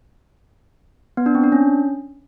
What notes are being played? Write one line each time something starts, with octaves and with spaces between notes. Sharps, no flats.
B3
D4
C4
D4
C#4